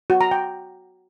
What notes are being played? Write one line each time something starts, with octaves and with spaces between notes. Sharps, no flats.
F#4
A#5
G5